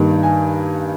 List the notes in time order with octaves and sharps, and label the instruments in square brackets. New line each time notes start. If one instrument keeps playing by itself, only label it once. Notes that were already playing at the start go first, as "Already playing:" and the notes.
Already playing: [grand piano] G2 D#3 G3 A#3
G#5